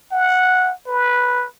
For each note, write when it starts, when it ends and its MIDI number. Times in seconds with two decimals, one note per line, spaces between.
0.12 0.73 78
0.87 1.46 71